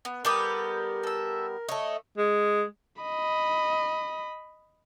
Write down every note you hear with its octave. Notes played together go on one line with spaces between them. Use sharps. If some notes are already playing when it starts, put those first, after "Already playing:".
B3
G3 B3 G4 A4 A#4 D6 D#6
A4 E5
A3 C#5 D#5
G#3
D#5 B5